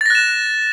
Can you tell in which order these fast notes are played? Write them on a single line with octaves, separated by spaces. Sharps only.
A6 A#6 F#6 E7